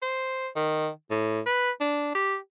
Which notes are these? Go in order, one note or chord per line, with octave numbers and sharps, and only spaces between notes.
C5
D#3
A2
B4
D4
G4